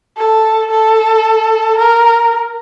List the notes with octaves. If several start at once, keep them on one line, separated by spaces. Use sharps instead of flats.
A4
A4
A#4